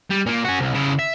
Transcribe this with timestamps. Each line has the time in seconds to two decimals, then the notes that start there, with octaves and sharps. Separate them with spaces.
0.10 G3
0.26 A#2 A#3
0.44 C#4 F#4
0.59 C2
0.74 C#3 E4
0.99 E5